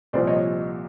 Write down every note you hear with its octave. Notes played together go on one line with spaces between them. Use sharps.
C2 A#2 F3 C5 D5
C#5 D#5